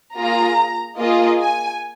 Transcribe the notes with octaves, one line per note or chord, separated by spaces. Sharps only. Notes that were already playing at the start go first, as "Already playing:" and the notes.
A#3 F4 G#4 A#5
A#3 F4 G#4 D#5
G#5